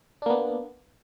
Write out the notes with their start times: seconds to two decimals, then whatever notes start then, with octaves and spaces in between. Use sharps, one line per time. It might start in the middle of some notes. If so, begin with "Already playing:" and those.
0.22 D4
0.26 A#3
0.30 B3